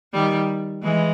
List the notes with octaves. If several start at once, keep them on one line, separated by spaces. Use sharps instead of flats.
D#3 G3
E3 G#3